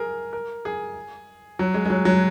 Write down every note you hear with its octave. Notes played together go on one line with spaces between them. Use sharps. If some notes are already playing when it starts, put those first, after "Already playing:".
Already playing: G#4 A#4
A#4
G#4
F#3
G#3
G#3
F#3
F#3